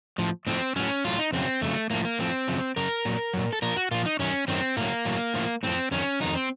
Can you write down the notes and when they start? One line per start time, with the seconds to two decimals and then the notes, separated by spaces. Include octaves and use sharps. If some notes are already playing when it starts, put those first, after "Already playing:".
0.18 A2 F3
0.47 A2 F3 C4
0.76 A2 F#3 C#4
1.05 A2 F#3 F4
1.19 D#4
1.32 F2 C#3 F#3 C4
1.61 F2 C#3 F#3 A3
1.90 A2 F3 A#3
2.05 A#3
2.19 A2 F3 C4
2.48 F#2 C#3 F3
2.76 F#2 C#3 A#4
3.05 A#2 F#3
3.33 A#2 F#3
3.53 A4
3.62 A#2 F3 A#4
3.76 F#4
3.91 A#2 F3 F4
4.06 D#4
4.19 F#2 D#3 F#3 C#4
4.48 F#2 D#3 F#3 C4
4.77 A2 F#3 A#3
5.05 A2 F#3
5.34 A2 F3
5.63 A2 F3 C4
5.91 F2 D#3 F#3 C#4
6.20 F2 D#3 F#3 D#4
6.35 C4